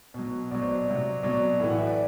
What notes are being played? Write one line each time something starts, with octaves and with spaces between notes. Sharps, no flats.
B2 F#3
B2 F#3 D5
C5
D5
C3 F#3
B2 F#3 D5
A2 E3
F#5
E5
D5